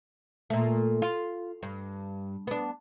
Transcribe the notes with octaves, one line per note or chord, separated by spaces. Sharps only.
A#2 A3
F4
G2
B3 D4